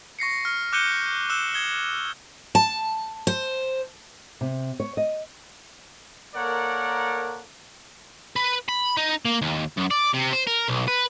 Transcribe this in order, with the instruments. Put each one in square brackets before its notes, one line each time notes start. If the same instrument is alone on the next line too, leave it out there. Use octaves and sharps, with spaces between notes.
[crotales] C#6 A#6 C7 C#7
F6
D6 F#6 G6 C#7 D#7 G7
E6 F#6 E7 G7
D#6 G#6 E7 G7
[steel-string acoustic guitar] A5
C5
[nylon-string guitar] C3
C#5
D#5
[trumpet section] A#3 A4 A#4 C#5 D5 F#5
[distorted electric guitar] B4
B5
D#4
A#3
D#2
F#2
D5
C3
C5
A#4
B1
B4